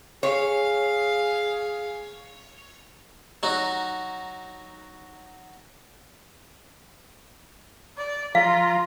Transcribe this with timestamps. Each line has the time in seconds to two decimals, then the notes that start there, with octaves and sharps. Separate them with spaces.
0.23 G#4 C#5 F5
3.43 F#3 D#4 F#4
7.98 D5
8.35 F3 F4 F5 A#5